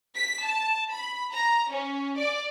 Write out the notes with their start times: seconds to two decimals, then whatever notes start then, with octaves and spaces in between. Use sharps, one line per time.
0.14 B6
0.44 A5
0.93 B5
1.33 A#5
1.71 C#4
2.17 D5